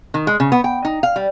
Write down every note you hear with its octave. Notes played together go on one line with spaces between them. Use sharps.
D#3
G#3
C#3
B3
G5
D#4
F5
G3